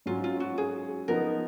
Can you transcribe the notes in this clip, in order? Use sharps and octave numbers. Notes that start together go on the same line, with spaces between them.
G#2 F#3 C#4 F4
F4
F#4
G#4
F3 B3 D#4 A#4